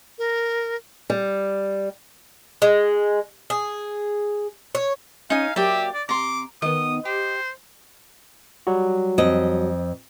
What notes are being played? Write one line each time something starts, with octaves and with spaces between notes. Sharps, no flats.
A#4
G3
G#3
G#4
C#5
C#4 D#4 F5 G#5 D#6
F#3 A#3 G4 D5 E5
D5
C3 A#5 C6 D6
D#3 B3 D#5 D#6
G4 C5
F#3 G3 F#4
F2 D#5